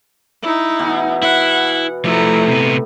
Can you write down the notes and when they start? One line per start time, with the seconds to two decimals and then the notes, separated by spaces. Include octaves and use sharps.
0.43 D#4 E4
0.79 B2 E3
1.23 E4 F#5
2.05 A2 F3 A3 E4 A#5
2.48 C3 B3